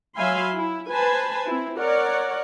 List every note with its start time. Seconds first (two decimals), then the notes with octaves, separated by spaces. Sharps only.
0.17 F#3 E5 F5 G#5 B5 C6
0.53 E4
0.90 B4 C5 G#5 A5 B5
1.47 C4 E4
1.78 A#4 C#5 D5 F#5